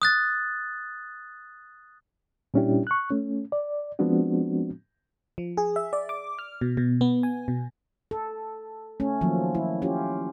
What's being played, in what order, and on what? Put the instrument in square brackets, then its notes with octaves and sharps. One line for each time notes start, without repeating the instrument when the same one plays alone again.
[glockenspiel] D#6 F#6 A6
[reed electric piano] A#2 G3 C#4 D4 E4 G4
C#6 F#6
A3 C#4
D5
F3 G#3 B3 C4 D4 F#4
[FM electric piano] F3
G#4
E5
D5
D6
F6
B2
B2
B3
G#5
B2
[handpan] A4
A3 C#4
D#3 F3 F#3 A#3
E4
C#4 F4 G4